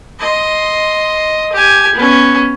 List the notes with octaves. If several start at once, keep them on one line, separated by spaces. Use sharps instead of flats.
D#5 C6
G4 G#5
B3 C#4